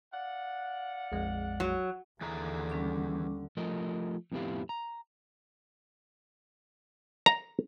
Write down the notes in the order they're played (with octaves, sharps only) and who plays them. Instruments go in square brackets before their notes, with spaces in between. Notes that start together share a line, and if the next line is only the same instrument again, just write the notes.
[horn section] D5 F5 F#5
[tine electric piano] A#1 F2 G#3
[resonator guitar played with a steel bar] F#3
[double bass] D#2 D3 [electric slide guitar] E3 G#4 A#5
[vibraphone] G3 C#4 D6
[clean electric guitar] F3 A3 A#4 D#5
F2 A2 B3 E4 G4 F5
A#5
[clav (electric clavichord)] A#5